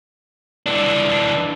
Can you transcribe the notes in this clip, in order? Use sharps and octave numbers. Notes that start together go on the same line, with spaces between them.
E3 D4